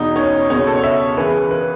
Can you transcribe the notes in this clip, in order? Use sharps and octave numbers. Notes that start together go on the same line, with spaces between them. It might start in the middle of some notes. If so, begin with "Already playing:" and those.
Already playing: E2 B2 D#4
C#4
C#2 B2 C#4
A4
C#5
E5
C#2 C#3 E3 B4
B4